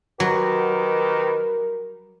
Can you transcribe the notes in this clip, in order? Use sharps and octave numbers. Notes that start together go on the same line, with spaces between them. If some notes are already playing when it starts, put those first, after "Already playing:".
D#3 F#3 G4 A#4 B4